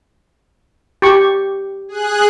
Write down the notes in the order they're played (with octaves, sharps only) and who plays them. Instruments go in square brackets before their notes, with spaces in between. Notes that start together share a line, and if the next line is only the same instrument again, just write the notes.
[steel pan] G4 C#6
[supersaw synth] G#4 F#6